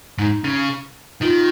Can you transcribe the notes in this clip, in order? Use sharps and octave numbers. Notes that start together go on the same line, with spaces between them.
G#2 D#4
C#3
D#3 F4